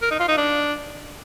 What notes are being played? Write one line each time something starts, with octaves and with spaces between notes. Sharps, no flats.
A#4
D#4
F4
D#4
D4